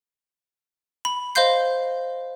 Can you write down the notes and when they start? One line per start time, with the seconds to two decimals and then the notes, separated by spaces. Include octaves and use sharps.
1.05 B5
1.35 C5 D#5 F5 C6 G6 C7